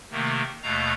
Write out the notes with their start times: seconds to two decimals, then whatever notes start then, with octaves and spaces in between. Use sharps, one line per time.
0.11 C3 D#3 A3 A#3
0.63 D#2 B2 A3 F5 A#5